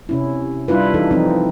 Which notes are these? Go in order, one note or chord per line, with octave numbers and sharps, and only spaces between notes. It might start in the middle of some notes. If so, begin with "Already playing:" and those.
C3 C#4 E4
G3 D4 E4 F4 B4
E3 D#4 A4
E3 F3 C4 D#4